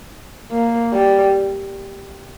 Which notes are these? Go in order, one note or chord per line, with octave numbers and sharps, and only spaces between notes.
A#3
G3